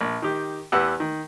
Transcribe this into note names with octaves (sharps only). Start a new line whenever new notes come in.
A#1
D#3 G4
E2 B3 G4 F#5 E6
D#3